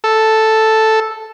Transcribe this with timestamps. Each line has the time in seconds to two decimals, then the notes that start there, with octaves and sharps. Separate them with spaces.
0.04 A4